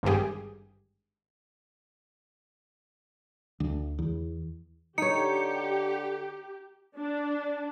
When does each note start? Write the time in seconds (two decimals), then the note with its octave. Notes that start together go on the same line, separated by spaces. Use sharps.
0.03 G#1 G2 D3 G4 G#4
3.60 D2
3.99 E2
4.98 D3 D#4 G4 C#5 C#7
6.98 D4